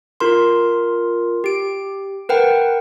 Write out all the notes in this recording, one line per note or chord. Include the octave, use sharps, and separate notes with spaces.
F4 A#4 C6
G4 D7
A#4 B4 F#5 G5